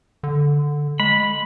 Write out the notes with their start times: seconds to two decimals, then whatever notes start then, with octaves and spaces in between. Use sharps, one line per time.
0.23 D3
1.00 G#3 B5